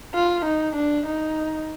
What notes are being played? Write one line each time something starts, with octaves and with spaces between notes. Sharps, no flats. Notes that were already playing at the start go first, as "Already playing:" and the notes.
F4
D#4
D4
D#4